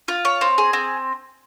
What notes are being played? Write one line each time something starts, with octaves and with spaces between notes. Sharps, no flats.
F4
C#5
C4
G#4
C4